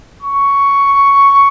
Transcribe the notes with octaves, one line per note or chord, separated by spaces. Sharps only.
C#6